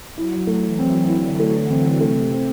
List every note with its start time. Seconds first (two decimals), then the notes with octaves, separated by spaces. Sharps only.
0.17 F#3 E4
0.47 A3
0.64 E3
0.79 C4
1.08 D3 E4
1.40 A3
1.54 E3
1.70 C4
2.00 C3 A3
2.31 C4